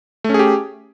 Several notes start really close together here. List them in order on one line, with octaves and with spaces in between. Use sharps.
A3 C#4 G#4 G4